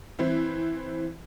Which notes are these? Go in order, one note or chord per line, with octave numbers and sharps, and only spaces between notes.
E3 C4 E4